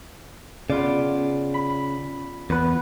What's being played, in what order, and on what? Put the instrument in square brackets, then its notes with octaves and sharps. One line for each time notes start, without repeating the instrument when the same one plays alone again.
[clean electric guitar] C#3 [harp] B3 F4 D5
[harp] B5
[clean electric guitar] E2 B4 [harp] B3